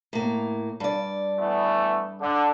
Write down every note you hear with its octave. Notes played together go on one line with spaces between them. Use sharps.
A2 A#3
G2 D5
E3 A3 B3
D3 D4